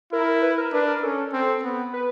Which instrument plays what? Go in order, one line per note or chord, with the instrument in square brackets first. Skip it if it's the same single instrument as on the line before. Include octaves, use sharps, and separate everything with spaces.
[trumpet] E4 [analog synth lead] A#4
[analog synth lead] B4
A#4
[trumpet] D4 [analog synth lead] B4
[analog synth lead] A#4
[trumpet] C#4 [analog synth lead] A4
[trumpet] C4
B3
[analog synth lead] B4